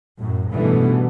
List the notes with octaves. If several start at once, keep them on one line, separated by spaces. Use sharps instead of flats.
F#2 A2
G#2 B2 D3 E3 G3 A3